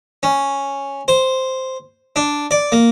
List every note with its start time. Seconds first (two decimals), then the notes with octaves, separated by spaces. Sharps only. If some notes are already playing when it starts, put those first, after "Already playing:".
0.23 C#4
1.08 C5
2.16 D4
2.51 D5
2.72 A#3